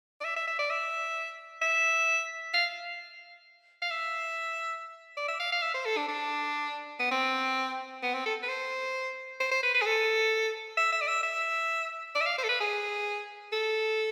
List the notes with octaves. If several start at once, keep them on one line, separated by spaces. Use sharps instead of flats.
D5
E5
E5
E5
D5
E5
E5
F5
F5
E5
D5
E5
F5
F5
E5
C5
A4
D4
D4
B3
C4
B3
C4
A4
B4
C5
C5
C5
B4
B4
G#4
A4
E5
E5
D5
E5
E5
D5
E5
F5
C5
A4
B4
G#4
A4